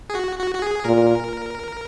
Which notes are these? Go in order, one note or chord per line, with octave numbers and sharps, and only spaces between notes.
G#4
F#4
F#4
F#4
G#4
A#2 A#4